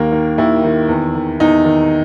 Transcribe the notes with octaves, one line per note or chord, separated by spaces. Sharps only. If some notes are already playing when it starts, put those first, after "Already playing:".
Already playing: D#2 D#3 A#3 A#4
D#3
D#2 E4
D#3
E2
D#3
E2 D#4
D#3